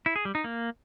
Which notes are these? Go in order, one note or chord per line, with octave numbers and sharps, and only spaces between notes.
E4
G#4
G3
D#4
A#3